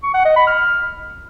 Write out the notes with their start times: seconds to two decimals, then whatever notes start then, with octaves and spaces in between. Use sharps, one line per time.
0.03 C#6
0.14 F#5
0.25 D#5
0.36 B5
0.47 F6